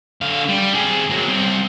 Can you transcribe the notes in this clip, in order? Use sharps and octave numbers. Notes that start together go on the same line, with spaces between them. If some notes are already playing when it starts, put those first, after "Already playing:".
D3 F5
G3
C4 G#4
F#3 A#3
C2 C4